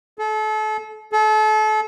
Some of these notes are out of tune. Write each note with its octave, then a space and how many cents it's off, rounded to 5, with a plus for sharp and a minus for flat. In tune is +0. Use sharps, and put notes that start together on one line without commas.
A4 -35
A4 -35